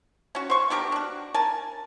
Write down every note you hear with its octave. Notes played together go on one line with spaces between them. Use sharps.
C#4 F#4
C5 C#6
B3 D4 G4 A#4
D4 F#4
A#4 G#5 A5